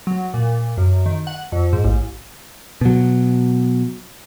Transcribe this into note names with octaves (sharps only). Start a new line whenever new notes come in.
F#3
A#2
F#2
D#3
F#5
F2
G#2
A1
B2 F#3